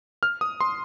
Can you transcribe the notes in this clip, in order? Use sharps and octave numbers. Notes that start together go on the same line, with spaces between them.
F6
D#6
C6